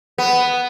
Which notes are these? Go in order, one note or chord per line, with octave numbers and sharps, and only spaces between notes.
B3